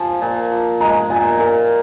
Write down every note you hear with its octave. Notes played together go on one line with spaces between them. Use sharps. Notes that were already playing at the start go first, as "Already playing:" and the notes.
Already playing: F3 G#5
A#2
F3
G#3 A#5
A#2 G#5
A#2 A#4